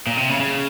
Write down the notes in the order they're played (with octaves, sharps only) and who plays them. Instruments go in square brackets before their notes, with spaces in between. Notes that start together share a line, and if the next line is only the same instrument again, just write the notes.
[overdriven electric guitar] A#2
C3
C#3
C#3